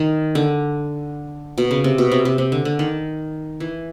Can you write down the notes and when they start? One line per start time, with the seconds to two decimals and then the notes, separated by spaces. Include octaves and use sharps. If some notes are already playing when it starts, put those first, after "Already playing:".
Already playing: D#3
0.35 D3
1.58 B2
1.71 C#3
1.84 C3
1.98 B2
2.12 C3
2.25 C3
2.38 C3
2.52 D3
2.65 D3
2.79 D#3
3.60 E3